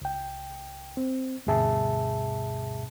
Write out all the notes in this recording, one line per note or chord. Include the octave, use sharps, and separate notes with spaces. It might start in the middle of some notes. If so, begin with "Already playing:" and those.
C#2 G5
C4
D2 G2 B2 G#4 E5 A5